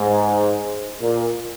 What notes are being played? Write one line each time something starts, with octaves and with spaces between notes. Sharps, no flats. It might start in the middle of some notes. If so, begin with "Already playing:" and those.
Already playing: G#2
A#2